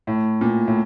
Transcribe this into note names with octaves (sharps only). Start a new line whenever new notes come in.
A2
A#2
A2